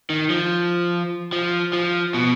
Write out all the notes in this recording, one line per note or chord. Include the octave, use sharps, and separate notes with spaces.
D#3
F3
F3
F3
B2